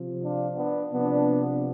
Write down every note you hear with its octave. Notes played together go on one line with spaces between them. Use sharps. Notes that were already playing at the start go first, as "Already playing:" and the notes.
Already playing: C3 F3
D4 F4
B3 D4
C3 F3 B3 D4